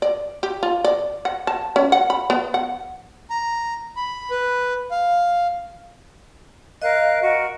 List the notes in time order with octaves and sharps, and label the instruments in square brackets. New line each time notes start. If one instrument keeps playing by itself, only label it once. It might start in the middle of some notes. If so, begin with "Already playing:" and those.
[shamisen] D5
G4
F4
D5
F#5
A5
C#4
F#5
B5
B3
F#5
[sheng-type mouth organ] A#5
B5
B4
F5
[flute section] A#4 F5 F#6 [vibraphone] D#5
[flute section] F#4 A#4